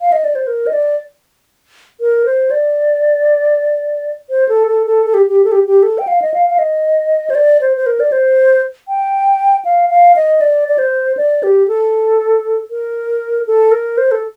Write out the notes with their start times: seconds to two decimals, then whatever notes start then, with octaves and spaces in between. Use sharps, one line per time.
0.01 F5
0.12 D#5
0.24 D5
0.35 C5
0.47 A#4
0.67 D#5
0.73 D5
2.01 A#4
2.26 C5
2.51 D5
4.30 C5
4.49 A4
4.68 A4
4.87 A4
5.06 A4
5.14 G4
5.29 G4
5.45 A4
5.52 G4
5.67 G4
5.83 A4
5.98 G5
6.08 F5
6.22 D#5
6.34 F5
6.50 F5
6.59 D#5
7.30 C5
7.35 D5
7.61 C5
7.77 C5
7.86 A#4
8.00 D5
8.12 C5
8.88 G5
9.65 F5
9.90 F5
10.16 D#5
10.41 D5
10.68 D5
10.78 C5
11.17 D5
11.43 G4
11.68 A4
12.71 A#4
13.47 A4
13.72 A#4
13.98 C5
14.11 A4